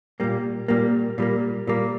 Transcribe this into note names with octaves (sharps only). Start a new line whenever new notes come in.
A#2 G3 A#3
A#2 G3 A#3
A#2 G3 A#3
A#2 G3 A#3